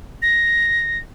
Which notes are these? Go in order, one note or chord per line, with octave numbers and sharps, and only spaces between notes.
A#6